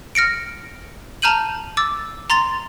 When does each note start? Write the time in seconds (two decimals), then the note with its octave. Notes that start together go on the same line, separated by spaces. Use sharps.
0.15 F6 A#6 C#7 D7
1.22 A5 A#5 F6 G6 D#7 F#7
1.77 D6 E6 A6
2.30 A#5 C6 A6 F7